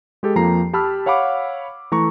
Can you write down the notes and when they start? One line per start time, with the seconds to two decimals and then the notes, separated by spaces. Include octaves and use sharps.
0.23 G#3 G4 A4
0.35 F2 F3 A#3 A#5 C7
0.73 G4 A5 B5 E6 F6
1.06 C#5 F5 F#5 B5 D6
1.92 E3 A3 A#5 C#6